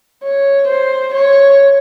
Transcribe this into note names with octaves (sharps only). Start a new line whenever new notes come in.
C#5
C5
C#5